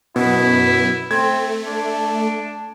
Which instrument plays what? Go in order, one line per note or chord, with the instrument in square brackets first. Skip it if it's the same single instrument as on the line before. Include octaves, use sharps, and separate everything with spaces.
[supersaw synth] F#2 B3 [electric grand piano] B2 [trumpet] E4
[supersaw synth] A3 [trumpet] C4 [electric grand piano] G#6
[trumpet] D4